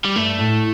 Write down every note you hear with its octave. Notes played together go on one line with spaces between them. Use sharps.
G3
G2 A3
A2